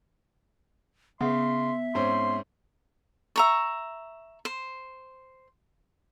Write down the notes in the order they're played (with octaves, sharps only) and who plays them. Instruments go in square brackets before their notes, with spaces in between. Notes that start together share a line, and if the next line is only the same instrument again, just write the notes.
[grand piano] C#3 [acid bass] B3 [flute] E5 [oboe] C6
[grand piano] G#2 C4 C#4 [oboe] C6
[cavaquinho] E5 A#5 C#6
C5